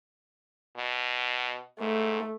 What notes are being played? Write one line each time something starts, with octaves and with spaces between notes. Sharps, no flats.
B2
G#2 A3